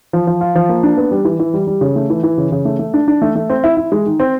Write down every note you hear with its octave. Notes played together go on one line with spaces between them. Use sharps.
F3
F3
F4
F3
A#3
D4
B3
G3
E3
E3
G3
G3
C#3
A3
E3
E3
C#3
C#3
A3
A3
D4
D4
A3
A3
C4
E4
E4
G#3
D#3
C4